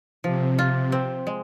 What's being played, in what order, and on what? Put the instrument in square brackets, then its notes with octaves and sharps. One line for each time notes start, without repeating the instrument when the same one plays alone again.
[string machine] C3 [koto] F3
[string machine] C3 [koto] F4
[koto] C4
G#3